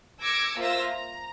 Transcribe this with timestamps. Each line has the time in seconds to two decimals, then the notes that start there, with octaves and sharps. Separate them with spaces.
0.22 D6 E6 G#6 A#6 C#7
0.58 A#3 F4 C5 E5 E6 A#6
0.92 A#5